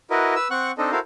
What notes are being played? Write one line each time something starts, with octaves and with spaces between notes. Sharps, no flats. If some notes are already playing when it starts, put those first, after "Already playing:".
E4 F#4 A#4 B4 D#5
B4 E6
C4 F#5 C#6 F#6
C4 D4 D#4 A4 D#5
E4 F#4 A4 A#4 C5 F5